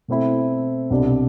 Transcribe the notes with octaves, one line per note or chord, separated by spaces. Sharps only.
B2 A3 C4 E4
C2 B2 G3 D4